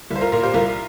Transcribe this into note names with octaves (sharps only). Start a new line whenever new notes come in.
C2
C5
F4 A#4
A#2 F4 A#4
G4 C5
C2 F4 A#4